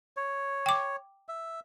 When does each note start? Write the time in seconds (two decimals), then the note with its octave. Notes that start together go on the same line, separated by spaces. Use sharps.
0.17 C#5
0.66 G5 D6
1.29 E5